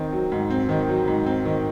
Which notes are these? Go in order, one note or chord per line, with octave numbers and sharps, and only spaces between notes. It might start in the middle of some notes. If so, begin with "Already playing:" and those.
Already playing: D#3 C4
F#3
G#2
C4
D#3
F#3
G#2
C4
D#3